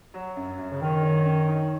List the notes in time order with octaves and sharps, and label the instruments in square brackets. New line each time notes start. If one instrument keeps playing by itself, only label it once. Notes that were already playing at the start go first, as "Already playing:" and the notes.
[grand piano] F#3
F#2
F#2
[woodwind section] C#3
[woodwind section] D#3 [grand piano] C#4
[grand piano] C#4
C#4
D#4